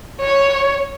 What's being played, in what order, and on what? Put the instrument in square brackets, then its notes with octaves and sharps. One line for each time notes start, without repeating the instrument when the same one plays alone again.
[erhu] C#5